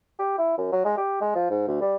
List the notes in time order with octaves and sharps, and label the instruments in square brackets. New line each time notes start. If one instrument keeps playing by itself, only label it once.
[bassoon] G4
E4
F#2
F#3
G#3
G4
G#3
F3
G#2
D2
G3